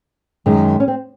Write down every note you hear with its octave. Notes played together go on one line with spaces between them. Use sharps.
F#2 D#3 G#3
C#4
C4